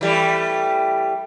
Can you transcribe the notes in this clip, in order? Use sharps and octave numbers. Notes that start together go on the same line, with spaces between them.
E3 G3 A3